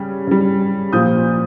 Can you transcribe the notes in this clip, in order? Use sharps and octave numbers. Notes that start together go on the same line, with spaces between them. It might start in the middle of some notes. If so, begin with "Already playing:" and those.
Already playing: C#3 G3
C#3 G3
A#2 F3 D#6 G6